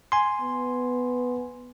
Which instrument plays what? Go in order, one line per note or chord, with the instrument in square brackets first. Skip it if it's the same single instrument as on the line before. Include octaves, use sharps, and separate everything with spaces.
[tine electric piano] G#5 C6
[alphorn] B3